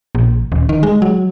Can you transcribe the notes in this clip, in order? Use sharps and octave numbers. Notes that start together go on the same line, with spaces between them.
A#1
D#1
D#3
G#3
F#3